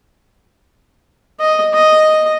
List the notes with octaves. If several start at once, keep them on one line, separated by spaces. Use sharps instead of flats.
D#5
D#5